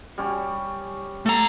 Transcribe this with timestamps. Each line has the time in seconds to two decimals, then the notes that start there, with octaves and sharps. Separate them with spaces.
0.18 G3 C#4
1.26 A3 A4 A#5